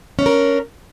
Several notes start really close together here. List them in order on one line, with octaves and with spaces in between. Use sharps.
C#4 D4 A#4